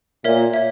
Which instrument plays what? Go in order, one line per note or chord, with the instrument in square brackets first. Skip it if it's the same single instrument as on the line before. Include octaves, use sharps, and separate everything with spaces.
[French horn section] A#2 [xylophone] A#4 C#5 E5
[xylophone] C#5 E5